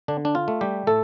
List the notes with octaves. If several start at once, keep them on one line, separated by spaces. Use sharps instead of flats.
D3 D4
D4
F4
A3
G3 G4
A2 A3 A4